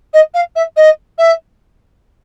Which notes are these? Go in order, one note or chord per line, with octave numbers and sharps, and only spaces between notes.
D#5
F5
E5
D#5
E5